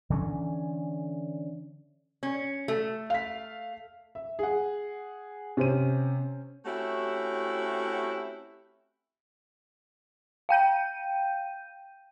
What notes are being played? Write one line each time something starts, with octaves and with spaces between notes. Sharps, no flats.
D3 E3 A#3 C#4
C#4
A3 A4
F5 B6
E5
G#4 F#5
C3 C#4 C5 D#7
A3 C4 C#4 E4 F#4 G4
F5 G5 G6 D#7